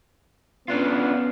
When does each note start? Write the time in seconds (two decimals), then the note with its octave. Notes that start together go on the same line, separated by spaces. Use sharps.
0.68 B3 C#4 D4 F4